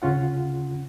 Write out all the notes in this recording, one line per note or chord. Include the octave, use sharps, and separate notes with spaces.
D2 C#3 C#4 F4 F#5